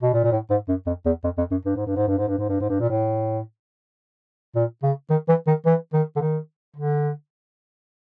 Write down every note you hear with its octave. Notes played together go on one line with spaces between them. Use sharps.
B2
A#2
A#2
A2
G#2
F#2
F2
E2
F2
F2
F#2
G2
G#2
G2
G#2
G2
G#2
G2
G#2
G2
G#2
G2
A#2
A2
A#2
C#3
D#3
E3
D#3
E3
D#3
D3
D#3
D3